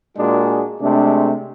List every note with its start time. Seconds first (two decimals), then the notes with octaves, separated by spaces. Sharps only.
0.16 A#2 G#3 D4 F#4 G#4
0.81 C3 G#3 A3 D4